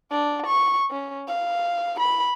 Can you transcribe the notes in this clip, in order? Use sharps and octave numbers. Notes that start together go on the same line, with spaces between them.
D4
C#6
C#4
F5
B5